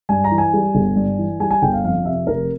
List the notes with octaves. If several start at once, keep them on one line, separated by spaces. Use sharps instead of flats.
G2 G#5
A#5
E3
G#5
G3
G1
G2
E3
G3 G#5
G#5
G1 G5
F5
F2 F5
C3 E5
F1 A#4